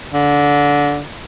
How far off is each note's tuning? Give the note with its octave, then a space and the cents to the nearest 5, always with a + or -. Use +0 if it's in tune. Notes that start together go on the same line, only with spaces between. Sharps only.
D3 -20